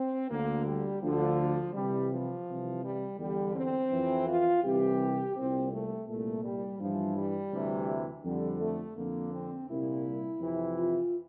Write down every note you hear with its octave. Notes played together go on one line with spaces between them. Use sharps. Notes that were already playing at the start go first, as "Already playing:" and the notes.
Already playing: C4
D2 D3 A#3
G3
D2 D3 F3
C2 C3 E3 G3
F3
C2 C3 E3
G3
E2 D3 G3
C4
F2 E3
F4
C2 C3 E3 G4
C2 A#2 C4
A3
C2 A#2 A3
G3
G2 E3 F3
G3
D2 C3 E3
F2 D3 G3
A3
F2 D3 A#3
C4
C2 A#2 E4
F2 C3 E3
F4